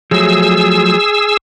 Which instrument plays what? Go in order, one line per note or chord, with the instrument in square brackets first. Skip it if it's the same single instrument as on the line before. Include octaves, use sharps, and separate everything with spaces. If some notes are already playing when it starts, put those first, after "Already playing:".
[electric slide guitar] F3 F#3 A3 [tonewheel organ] G#4 E6